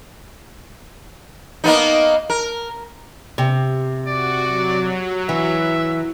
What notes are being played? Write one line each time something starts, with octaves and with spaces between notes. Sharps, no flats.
A#3 B3 D#4
A#4
C3
F#4 D5
F#3
E3 E5